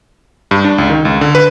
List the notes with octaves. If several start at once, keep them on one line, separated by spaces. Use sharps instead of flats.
G2
D4
C#2
D#3
C#2
D3
B4